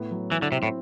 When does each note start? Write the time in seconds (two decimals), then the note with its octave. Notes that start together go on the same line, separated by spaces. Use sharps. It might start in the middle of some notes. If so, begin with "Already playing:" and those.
Already playing: A2 B3
0.11 F#3
0.31 E3 E4
0.42 D3
0.52 C3 C4
0.63 A2